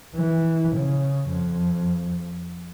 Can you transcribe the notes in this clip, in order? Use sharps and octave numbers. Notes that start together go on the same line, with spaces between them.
E3
C#3
F2